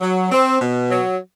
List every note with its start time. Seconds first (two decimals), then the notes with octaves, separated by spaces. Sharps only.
0.01 F#3
0.32 C4
0.61 B2
0.91 F#3